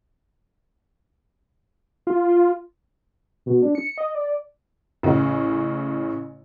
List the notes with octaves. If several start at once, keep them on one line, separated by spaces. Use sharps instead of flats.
F4
B2
D4
C#7
D#5
D5
A1 C#3